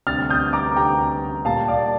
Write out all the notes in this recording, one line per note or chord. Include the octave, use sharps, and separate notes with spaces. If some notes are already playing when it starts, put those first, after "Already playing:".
D2 C3 G3 F6 A6
D#6 G6
A#5 D6
D2 C3 G3 G5 A#5
A#2 G3 A#3 F5 A5
D5 F5